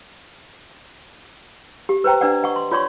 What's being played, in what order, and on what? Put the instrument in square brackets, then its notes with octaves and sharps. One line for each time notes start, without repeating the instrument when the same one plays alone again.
[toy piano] G4
B4 C5 G5 A#5
D4 B4 D5 F#5
D#5 F#5 C#6
C6
F4 C#5 D5 C6 C#6